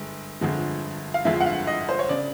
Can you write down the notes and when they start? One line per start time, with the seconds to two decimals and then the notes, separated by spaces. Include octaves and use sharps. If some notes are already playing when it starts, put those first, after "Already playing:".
Already playing: G1 G#3
0.41 G1 F2 D3 F3 G#3
1.14 F5
1.25 G1 F2 D3 F3 G#3 E5
1.40 F#5
1.46 F5
1.67 D#5
1.89 C5
1.99 C#5
2.09 C#3 D5